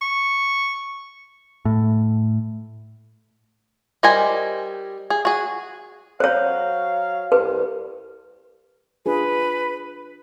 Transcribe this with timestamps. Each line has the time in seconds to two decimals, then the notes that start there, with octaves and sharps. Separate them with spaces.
0.02 C#6
1.65 A2
4.03 G3 A#4 C5 D#5 G#5
5.10 G#4
5.25 F#4 G#4
6.20 F#3 C5 C#5 F5
7.32 C2 B4
9.06 D4 F4 G#4 B4